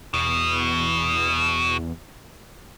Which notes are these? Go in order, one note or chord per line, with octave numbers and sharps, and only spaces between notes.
E2 B2